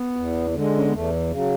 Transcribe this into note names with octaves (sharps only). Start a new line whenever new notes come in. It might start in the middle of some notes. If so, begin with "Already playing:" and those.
Already playing: B3
E2
D3 G#3
C#4
B3
E2 A3
C#3 F#3